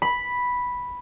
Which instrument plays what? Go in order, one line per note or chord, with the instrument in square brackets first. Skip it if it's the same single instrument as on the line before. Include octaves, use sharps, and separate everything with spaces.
[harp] B5